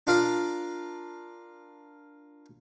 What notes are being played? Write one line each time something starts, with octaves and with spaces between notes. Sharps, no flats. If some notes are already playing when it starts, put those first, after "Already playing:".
D4 F4 A#4 D5